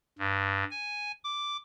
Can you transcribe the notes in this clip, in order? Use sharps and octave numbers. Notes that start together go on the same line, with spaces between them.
G2
G#5
D6